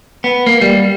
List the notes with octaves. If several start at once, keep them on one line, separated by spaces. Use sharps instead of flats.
B3
A#3
G3